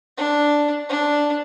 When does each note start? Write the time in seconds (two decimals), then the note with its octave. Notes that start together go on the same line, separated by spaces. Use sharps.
0.17 D4
0.89 D4